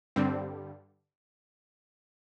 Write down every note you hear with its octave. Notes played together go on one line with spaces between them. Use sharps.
G2 D3 G3 C4